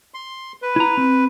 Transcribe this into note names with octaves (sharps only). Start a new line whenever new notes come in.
C6
B4
E4 A#5
C4